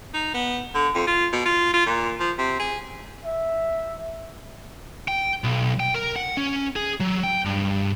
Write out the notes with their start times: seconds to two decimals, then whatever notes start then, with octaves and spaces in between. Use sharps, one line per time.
0.14 D#4
0.34 B3
0.75 D3
0.95 F2
1.07 F4
1.33 B2
1.46 F4
1.74 F4
1.87 A#2
2.20 F3
2.38 C3
2.59 G#4
3.24 E5
5.08 G5
5.44 B1
5.80 G5
5.94 A#4
6.16 F#5
6.37 C#4
6.76 G#4
7.00 F#3
7.23 G5
7.45 G2